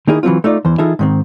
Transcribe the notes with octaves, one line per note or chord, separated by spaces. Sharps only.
D#3 A#3 D#4 E4 G#4
E3 F#3 C4 F4
A3 D#4 F4 D5
E2 E3 C5
E3 D#4 F4 G#4 A4 E5
G#2 D#3 C4